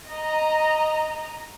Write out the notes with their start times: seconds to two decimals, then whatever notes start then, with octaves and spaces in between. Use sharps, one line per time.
0.12 D#5 A#5